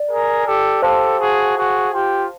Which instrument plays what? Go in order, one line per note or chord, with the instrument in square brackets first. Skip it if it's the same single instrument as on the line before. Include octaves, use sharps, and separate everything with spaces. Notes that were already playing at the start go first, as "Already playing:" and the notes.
Already playing: [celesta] D5
[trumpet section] G#4 A#4
G4 A4
[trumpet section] G4 A4 [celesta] C5 F5 A5 C6
[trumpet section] F#4 G#4
F#4 G#4
F4 G4